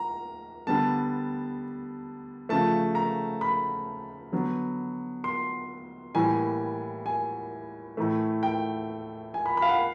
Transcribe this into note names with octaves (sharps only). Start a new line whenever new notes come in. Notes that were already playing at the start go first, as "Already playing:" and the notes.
Already playing: A#5
D3 G3 B3 A5
C#3 F3 A3 A5
A#5
B5
D3 F#3 B3
C6
A2 E3 G3 A#3 G#5
G#5
A2 E3 A3
G5
G#5
B5
B5
F5
F#5
F5